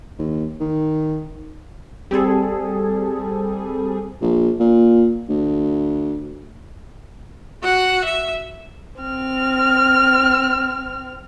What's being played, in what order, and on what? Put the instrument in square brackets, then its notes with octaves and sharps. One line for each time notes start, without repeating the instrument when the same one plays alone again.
[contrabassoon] D#2
D#3
[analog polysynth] G3 C4 G#4 A4
[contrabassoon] A#1
A#2
D2
[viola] F#4 F#5
E5
[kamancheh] C4 F6